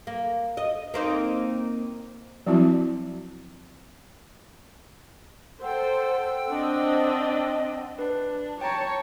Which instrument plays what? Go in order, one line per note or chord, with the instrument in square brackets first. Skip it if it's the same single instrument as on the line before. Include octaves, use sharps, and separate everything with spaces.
[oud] A#3
D#5
A#3 C4 D#4
[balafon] F3 F#3 C4 E4 F#4 A5
[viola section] A4 C5 [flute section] F#5 G5 E6
[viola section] C4 D4 D#5
[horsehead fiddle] D4 [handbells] B4
[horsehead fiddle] C#5 A5 [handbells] G5 A#5